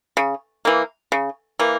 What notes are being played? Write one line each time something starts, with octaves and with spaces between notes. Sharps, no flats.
C#3
E3 A#3
C#3
E3 A#3